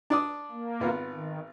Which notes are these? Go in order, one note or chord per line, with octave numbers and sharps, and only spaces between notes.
D4 D5 D#6
A#3
G#1 B3 F4
D#3